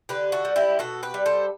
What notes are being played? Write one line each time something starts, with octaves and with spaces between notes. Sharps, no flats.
D3 G4 B4
F#4 A4
G3
E4 G4
B2 F#4 A4
G4 B4
G3
A4 C5